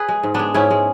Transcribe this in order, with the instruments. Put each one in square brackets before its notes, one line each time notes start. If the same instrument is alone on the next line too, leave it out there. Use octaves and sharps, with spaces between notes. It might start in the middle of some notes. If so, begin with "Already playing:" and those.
Already playing: [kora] G#4 B4 C#5
G#3
G#2
G#3 B3 D4
G#2 C#4 E4
G#3